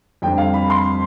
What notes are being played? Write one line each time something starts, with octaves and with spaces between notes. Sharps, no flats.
F2 D3 G3 C4 G5
F5
B5
C6